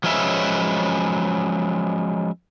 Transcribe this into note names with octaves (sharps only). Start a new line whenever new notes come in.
F3 F#3 G#3 C#4 B4 E5